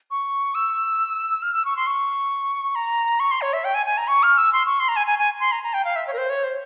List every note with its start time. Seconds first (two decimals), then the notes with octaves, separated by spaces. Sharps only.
0.11 C#6
0.55 E6
1.43 F6
1.54 E6
1.65 C#6
1.76 C6
1.87 C#6
2.75 A#5
3.20 C#6
3.31 C6
3.41 C#5
3.53 E5
3.64 G5
3.74 G#5
3.86 G#5
3.98 A#5
4.08 C#6
4.23 F6
4.38 E6
4.53 C6
4.66 C#6
4.79 C6
4.88 A#5
4.96 G#5
5.07 G#5
5.19 G#5
5.40 C6
5.52 A#5
5.63 A#5
5.74 G5
5.85 F5
5.96 E5
6.07 C#5
6.13 A#4
6.18 C5
6.29 C#5
6.43 C5